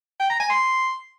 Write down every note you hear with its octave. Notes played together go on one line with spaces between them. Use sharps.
G5
A#5
G#5
C6